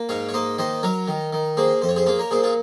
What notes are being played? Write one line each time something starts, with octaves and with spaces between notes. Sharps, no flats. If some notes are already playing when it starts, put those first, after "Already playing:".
Already playing: A#3
G#2 C#5 F5
C#5
A#3 C5 D#5
D#3 C5 D#5
F#3 A#4 C#5
D#3
D#3
A#3 G#4 C5
F2 C5
C#5
G#4 C5
A#3 F4 G#4
A#4 C#5
A#2 G#4 C5
F4 G#4